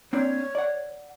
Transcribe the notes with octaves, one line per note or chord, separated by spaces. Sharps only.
A#3 C4 D4 C#5
D5 F#5